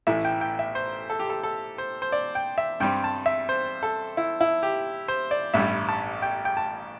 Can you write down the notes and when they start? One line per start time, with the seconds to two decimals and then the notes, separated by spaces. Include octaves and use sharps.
0.07 A1 A2 E3 A3 E5
0.25 G5
0.41 G5
0.59 E5
0.75 C5
1.10 A4
1.20 G4
1.30 A4
1.43 A4
1.78 C5
2.02 C5
2.12 D5
2.35 G5
2.58 E5
2.80 G2 G3 C4 G5
3.04 A5
3.26 E5
3.49 C5
3.83 A4
4.17 E4
4.41 E4
4.63 G4
5.08 C5
5.31 D5
5.54 A1 G2 G3 E5
5.89 A5
6.22 G5
6.45 G5
6.57 A5